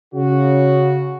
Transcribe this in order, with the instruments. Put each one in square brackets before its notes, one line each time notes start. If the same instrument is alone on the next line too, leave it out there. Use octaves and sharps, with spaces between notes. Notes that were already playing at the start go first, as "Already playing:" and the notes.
[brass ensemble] C#3 F#4